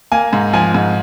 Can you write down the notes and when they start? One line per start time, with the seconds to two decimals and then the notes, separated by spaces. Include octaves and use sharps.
0.12 A#3 G#5
0.33 G#2
0.53 F3 G#5
0.74 G#2